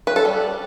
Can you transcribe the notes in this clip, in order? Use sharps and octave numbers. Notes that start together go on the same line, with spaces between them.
B4
A4
G3